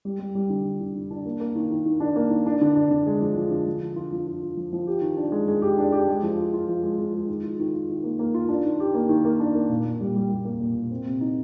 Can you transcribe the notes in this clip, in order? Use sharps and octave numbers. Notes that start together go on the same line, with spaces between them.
G3
G3
G3
D3
D3
D3
D3
D4
A#3
A#3
D#3
D#3
D#3
D4
A#3
D#3
D4
D3
D4
D3
G#3
F3
F3
D3
F3
F3
F4
F3
F4
F4
F3
F3
G4
D#3
D4
G#3
G#3
G4
D4
G4
G#3
F3
F4
F4
F3
G#3
F3
G#3
D#3
F4
D#3
F4
D#3
A#3
A#3
F4
D4
D#3
G4
A#3
D#3
A#3
D4
A#3
A#2
A#2
G3
G3
G3
A#3
A#2
A#2
C4
C3
D#4